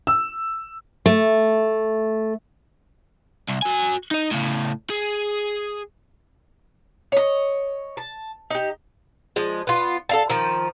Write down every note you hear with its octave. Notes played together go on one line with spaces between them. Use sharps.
E6
A3
C2
F#4 G#5
D#4 D#5
A2 C#3
G#4
C#5 D#5
A5
D#4 G4
F3 G#3
B3 F4
A4 F5 A5
D#3 F3